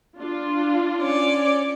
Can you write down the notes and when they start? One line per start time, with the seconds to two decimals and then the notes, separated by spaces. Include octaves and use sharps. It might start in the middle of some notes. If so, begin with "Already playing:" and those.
0.18 D4 F4
1.00 C#4 D5